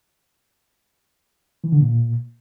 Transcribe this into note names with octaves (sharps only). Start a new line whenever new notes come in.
E3
D3
A#2